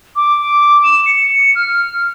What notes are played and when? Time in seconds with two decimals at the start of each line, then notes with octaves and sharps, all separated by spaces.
0.16 D6
0.84 E7
1.06 C#7
1.55 F6